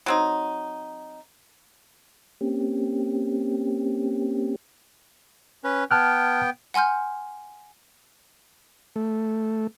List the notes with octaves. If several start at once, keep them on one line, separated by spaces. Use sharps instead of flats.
F#3 C4 D#4
A#3 C4 C#4 G4
C#4 B4
B3 G5 A5 F6 F#6
F#5 G#5 C6 F6 G6
A3